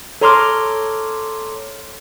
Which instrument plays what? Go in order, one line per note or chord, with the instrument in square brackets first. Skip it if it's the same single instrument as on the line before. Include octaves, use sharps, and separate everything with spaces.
[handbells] A4 C#5 A#5 C6 D6 F6